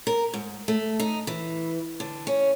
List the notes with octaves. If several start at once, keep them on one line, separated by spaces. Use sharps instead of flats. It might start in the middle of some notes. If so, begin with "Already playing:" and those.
A#4
G#2
A3
D#4
E3
D3
C#4